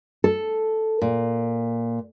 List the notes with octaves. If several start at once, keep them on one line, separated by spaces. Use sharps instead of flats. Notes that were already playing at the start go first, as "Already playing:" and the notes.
A4
A#2